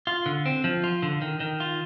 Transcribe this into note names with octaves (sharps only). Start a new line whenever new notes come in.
F4
D3
C4
F3
F4
D3
D#3
D#3
F4